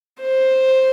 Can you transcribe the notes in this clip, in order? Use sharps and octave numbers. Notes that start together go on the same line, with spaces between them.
C5